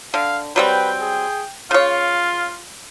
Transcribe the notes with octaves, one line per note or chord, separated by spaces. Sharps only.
D3 F5
F#3 G3 C4 B4 G5
G#4
C#3 F4 C#5 F5